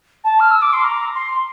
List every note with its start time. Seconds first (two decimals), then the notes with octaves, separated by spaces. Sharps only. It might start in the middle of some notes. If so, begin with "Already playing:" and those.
0.24 A5
0.40 F6
0.51 E6
0.62 D6
0.73 C6
0.84 A#5
1.15 C6